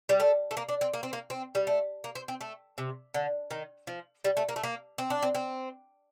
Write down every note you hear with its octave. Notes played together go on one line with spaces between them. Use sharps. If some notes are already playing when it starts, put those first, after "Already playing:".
G3
A3
A3
A#3
D4
C4
A#3
C4
A#3
C4
G3
A3
A#3
C4
C4
A3
C3
D3
D#3
F3
G3
A3
A#3
A3
A#3
C4
D4
C4
C4